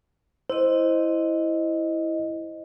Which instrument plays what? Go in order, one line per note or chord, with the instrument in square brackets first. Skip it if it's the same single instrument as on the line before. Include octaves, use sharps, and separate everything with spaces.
[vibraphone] E4 D#5 [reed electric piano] C5